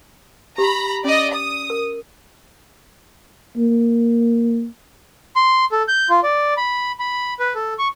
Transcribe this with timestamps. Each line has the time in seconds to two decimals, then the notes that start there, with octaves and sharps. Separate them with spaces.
0.58 G4 A#5 B5
1.04 C#4 D5 D#5
1.34 D#6
1.70 A#4
3.57 A#3
5.36 C6
5.72 A4
5.88 G6
6.10 F4
6.23 D5
6.57 B5
7.00 B5
7.40 B4
7.55 A4
7.79 C#6